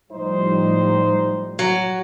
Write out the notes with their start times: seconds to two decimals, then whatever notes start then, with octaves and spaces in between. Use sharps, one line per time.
0.12 A2 F3 G3 D#4 C5
1.59 F#3